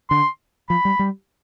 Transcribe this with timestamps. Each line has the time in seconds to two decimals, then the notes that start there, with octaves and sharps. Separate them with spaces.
0.10 D3 C6
0.69 F3 B5
0.85 G3
0.99 G3